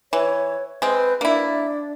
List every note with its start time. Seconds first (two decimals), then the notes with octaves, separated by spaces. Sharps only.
0.13 E3 C#5
0.82 G#3 C4 B4
1.21 A#3 D4 E4